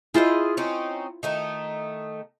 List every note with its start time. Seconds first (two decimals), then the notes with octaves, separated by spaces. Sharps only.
0.14 E4 F4 G#4 C5 D#5
0.57 C4 C#4 D#4
1.23 D#3 A3 D#4